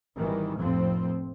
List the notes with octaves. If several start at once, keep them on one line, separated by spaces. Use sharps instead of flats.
G#1 D#3 E3 G3
F1 F2 A2 F3 C4